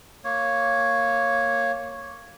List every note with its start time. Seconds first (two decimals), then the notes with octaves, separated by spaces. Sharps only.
0.24 A#3 C#5